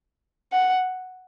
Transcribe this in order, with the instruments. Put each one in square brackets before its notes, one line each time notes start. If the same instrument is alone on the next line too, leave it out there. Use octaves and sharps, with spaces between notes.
[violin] F#5